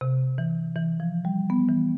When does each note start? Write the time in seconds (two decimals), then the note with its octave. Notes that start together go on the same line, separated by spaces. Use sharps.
0.01 C3
0.38 E3
0.76 E3
1.00 F3
1.25 G3
1.50 B3
1.68 E3